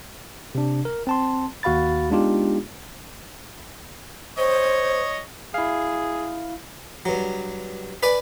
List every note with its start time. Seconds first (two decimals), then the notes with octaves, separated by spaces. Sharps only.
0.55 C3 D4
0.85 A#4
1.07 C4 A5 C6
1.63 D#2 F#4 F5 B5 A6
2.10 G#3 B3 D4 D#4 F4 G4
4.38 C5 C#5 D#5
5.54 E4 G#4 F5
7.05 G2 F#3
8.03 B4 D5 G#5